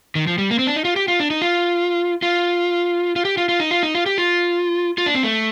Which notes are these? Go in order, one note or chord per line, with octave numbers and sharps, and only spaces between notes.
D#3
F3
G3
A#3
C4
D4
D#4
F4
G4
F4
D4
D#4
F4
F4
F4
G4
F4
F4
D#4
F4
D#4
F4
G4
F4
F4
D4
C4
A3